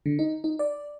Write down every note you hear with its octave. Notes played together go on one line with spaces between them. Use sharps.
D3
D#4
D#4
D5